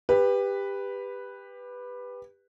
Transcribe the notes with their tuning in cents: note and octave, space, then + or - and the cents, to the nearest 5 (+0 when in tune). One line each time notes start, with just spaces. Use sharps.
G4 +20 B4 +0